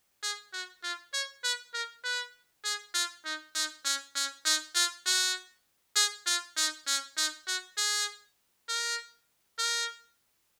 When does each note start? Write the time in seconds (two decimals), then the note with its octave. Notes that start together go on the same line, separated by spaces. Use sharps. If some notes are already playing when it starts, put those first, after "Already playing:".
0.23 G#4
0.53 F#4
0.83 F4
1.13 C#5
1.44 B4
1.74 A#4
2.04 B4
2.64 G#4
2.95 F4
3.25 D#4
3.55 D#4
3.85 C#4
4.16 C#4
4.46 D#4
4.75 F4
5.06 F#4
5.96 G#4
6.27 F4
6.57 D#4
6.87 C#4
7.17 D#4
7.47 F#4
7.78 G#4
8.69 A#4
9.59 A#4